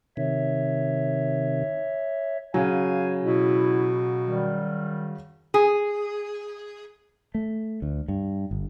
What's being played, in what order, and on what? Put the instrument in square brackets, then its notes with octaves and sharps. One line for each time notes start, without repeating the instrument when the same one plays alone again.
[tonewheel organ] C3 D#3 [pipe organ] C#5 E5
[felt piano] C#3 F#3 [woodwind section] F5 G#5
[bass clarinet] B2 [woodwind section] E4
[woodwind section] D#3 G3
[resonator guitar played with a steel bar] G#4
[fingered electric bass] A3
D2
G2
G1